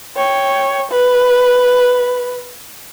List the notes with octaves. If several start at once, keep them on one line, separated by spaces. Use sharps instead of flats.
C#5 G5
B4